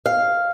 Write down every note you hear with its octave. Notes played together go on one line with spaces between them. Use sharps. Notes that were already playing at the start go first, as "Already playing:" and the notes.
F5